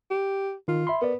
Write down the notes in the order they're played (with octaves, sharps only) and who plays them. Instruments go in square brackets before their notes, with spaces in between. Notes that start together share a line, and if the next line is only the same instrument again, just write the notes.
[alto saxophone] G4
[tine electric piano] D#3 [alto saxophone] F4
[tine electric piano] E5 B5 C6
[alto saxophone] B3 [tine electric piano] A#4 D5